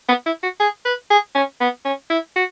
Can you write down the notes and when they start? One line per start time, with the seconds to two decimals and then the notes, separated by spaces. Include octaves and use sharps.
0.09 B3
0.26 E4
0.43 F#4
0.60 G#4
0.85 B4
1.10 G#4
1.35 C#4
1.61 B3
1.85 C#4
2.10 E4
2.36 F#4